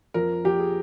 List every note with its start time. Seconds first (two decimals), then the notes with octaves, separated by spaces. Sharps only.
0.14 F2 A#4
0.45 F2 G4
0.60 G#4